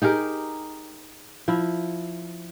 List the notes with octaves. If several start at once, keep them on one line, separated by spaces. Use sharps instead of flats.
D#4 G4 G#4 A#4
F3 E4